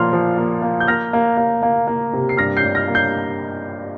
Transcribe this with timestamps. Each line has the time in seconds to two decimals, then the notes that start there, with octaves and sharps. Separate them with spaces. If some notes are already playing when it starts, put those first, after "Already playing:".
Already playing: A#2 F3 A#3 C6 F6
0.13 F3
0.37 A#3
0.62 A#3
0.80 G6
0.88 A#3 F6 A#6
1.13 A#3
1.37 A#3
1.63 A#3
1.87 A#3
2.14 C3
2.29 C7
2.37 G2 F6 A#6
2.57 G6 C7
2.63 G2
2.75 F6 A#6
2.88 A#3
2.95 G6 C7